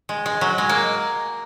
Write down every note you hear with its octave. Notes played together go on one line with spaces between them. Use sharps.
G#3
G#3
F#3
G#3
A#3